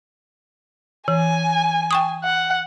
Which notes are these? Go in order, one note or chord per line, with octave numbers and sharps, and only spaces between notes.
E3 G#5
G5 C#6 D#6
F#5